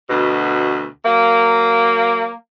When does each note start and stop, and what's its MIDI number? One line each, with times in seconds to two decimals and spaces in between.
0.10 0.87 38
0.10 0.87 47
1.05 2.32 54
1.05 2.32 58